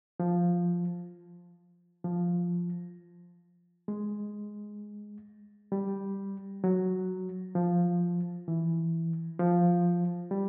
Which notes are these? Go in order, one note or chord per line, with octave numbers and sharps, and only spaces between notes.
F3
F3
G#3
G3
F#3
F3
E3
F3
G3